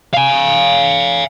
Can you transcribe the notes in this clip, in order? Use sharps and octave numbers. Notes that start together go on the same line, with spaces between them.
F5 G#5